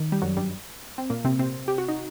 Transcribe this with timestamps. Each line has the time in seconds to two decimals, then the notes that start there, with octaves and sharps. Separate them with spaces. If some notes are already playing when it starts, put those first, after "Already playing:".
Already playing: D#3
0.12 G3
0.22 F#2 F#3
0.37 G2 G3
0.98 C4
1.10 A#2 A#3
1.25 C3 C4
1.39 C3 C4
1.68 G4
1.78 F#4
1.88 D#4